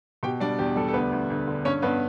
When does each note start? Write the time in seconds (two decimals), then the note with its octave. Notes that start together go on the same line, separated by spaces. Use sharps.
0.23 B2 G4 G5
0.40 G3 D4 D5
0.58 E2 G4
0.76 G3 A4
0.88 A4
0.93 D2 B3 B4
1.12 D2
1.30 D2
1.47 D3
1.65 G2 C#4 C#5
1.82 G2 B3 B4